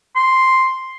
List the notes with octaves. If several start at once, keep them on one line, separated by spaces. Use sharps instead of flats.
C6